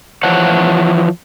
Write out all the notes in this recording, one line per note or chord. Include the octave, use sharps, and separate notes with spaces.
E3 F3 C#5 F#5 A5